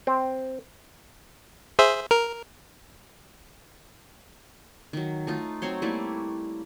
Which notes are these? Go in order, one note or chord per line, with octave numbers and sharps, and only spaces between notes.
C4
G#4 C5 E5
A#4
D#3 F#3
A3 D#4 F4
F#3 C4 C#5 C6
G3 A3 A#3 E4